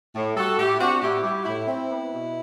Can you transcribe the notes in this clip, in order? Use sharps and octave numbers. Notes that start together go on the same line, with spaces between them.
A2
G3 F#4 A4
A2 E4 G4
C4 D4 F#4
A2 E4 G4
G3 E4 G4
F#4
A2 E4
C4 E4
B3
B2